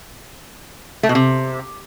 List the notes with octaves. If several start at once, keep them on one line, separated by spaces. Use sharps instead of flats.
A3
B2
C3